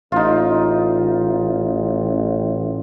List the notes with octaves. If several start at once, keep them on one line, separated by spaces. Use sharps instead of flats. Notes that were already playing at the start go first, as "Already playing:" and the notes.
A1 D#4 F4